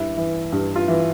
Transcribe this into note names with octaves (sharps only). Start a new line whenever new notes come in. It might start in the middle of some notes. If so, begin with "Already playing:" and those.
Already playing: G2 E4
E3
G2
F4
E3